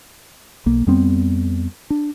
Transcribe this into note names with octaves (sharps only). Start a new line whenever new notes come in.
B1 A#3
F2 G3 B3 C4
D4